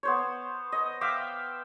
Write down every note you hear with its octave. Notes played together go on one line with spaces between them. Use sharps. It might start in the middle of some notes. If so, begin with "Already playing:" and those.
B3 C5 C#5
D#5
E5 F5 G5 D6